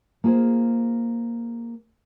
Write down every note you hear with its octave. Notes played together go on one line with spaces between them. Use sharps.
A#3 F4 G#4 C5